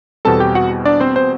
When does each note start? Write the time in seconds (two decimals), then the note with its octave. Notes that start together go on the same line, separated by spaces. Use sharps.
0.25 E2 B2 G3 C4 A4 A5
0.40 G4 G5
0.55 F#4 F#5
0.85 D4 D5
1.00 C4 C5
1.16 C4 C5